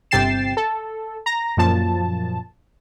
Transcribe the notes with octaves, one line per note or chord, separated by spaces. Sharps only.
G1 C3 G5 A6 C7 E7
A4
A#5 A#6
F#2 A#2 F3 A5